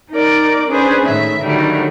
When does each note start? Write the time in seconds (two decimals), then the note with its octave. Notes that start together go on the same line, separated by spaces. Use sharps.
0.11 D#4 A#4 D5 D6
0.68 C#4 D4 G#4 B4 C5
1.05 A2 D#3 E5
1.42 D3 D#3 F#3 G3 A3